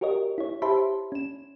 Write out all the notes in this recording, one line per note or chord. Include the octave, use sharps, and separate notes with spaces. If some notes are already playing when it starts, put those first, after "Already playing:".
F#4 G4 A#4 C#5 D#5
E4 C#5
G4 C5 E5 A5 B5 C6
C#4 E7